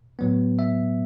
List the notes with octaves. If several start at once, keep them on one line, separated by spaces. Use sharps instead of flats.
A2 F#3 B3
E5